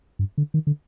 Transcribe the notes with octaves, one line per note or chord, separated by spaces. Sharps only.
G2
D3
D#3
D3